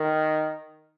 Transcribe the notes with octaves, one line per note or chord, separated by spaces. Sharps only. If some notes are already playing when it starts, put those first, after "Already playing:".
Already playing: D#3 A#4